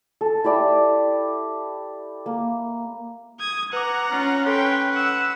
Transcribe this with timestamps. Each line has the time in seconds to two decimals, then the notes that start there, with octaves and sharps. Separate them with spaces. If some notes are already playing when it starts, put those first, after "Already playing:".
0.21 A4
0.44 E4 G4 D5 E5
2.26 A#3
3.40 D#6 G#6
3.73 B4 F#5 A#5 D6
4.11 C#4 F4
4.46 A4 B4 C#5 G5 C6
4.93 F#5 E6